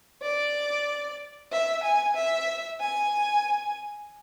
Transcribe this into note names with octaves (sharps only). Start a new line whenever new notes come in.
D5
E5
G#5
E5
G#5